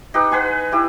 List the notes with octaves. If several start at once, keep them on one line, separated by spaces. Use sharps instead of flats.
D#4 G4 B4
B4 F#5 G#5 C6
E4 G4